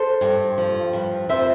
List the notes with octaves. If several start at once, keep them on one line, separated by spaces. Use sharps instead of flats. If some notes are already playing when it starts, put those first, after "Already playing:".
Already playing: A4 C5
G2
F3
G2
F2 C5 E5